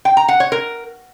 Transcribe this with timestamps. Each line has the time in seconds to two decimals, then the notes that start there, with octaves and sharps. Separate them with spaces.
0.05 G5
0.17 A#5
0.28 F#5
0.40 C#5
0.52 A#4